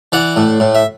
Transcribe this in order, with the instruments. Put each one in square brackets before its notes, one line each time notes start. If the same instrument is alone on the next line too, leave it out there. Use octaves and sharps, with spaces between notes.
[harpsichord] E3 D5 F#5
A2
A2
E5